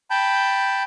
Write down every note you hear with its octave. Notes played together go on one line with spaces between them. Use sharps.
G5 A5 B5 G6